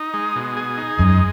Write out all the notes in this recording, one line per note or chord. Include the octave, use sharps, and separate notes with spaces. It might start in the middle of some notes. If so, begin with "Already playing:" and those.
Already playing: D#4
G#3
B2
G#4
D#4
F#2 G#3